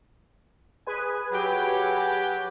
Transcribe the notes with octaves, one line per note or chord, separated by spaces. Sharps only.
G#4 B4 G#5
F#3 G4